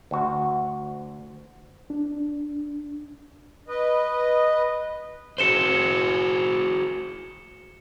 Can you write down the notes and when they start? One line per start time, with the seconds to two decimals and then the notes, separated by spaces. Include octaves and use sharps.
0.11 D2 F#4
1.90 D4
3.68 B4 D#5
5.38 F#4 G#4 C5 C#7 E7 G7